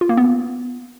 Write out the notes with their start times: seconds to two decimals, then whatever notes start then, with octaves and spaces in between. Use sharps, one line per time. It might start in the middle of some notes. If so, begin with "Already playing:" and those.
0.01 F4
0.09 A#3
0.17 B3